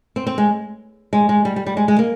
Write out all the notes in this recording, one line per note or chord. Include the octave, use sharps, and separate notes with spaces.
C4
C4
G#3
G#3
G#3
G3
G3
G3
G#3
G#3
A#3